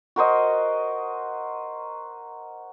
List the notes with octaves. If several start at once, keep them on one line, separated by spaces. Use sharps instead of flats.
F#4 A#4 C5 D#5